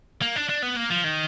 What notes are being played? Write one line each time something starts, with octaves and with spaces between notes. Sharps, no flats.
A#3
D4
D4
B3
A#3
F3
D#3